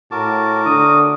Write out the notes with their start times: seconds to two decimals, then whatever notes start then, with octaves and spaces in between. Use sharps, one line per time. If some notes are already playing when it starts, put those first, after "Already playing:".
0.12 A2 F#4 A#4 A5 D6
0.66 D3 D#6